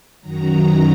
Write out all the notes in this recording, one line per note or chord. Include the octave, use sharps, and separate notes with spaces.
F#2 D#3 F#3 A#5